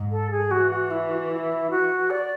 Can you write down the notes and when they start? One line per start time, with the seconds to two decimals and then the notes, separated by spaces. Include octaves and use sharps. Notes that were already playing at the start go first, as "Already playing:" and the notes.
Already playing: G#2
0.11 A4
0.30 G#4
0.50 E3 F#4
0.71 F#4
0.90 E4
1.10 F#4
1.30 E4
1.70 F#4
2.10 D5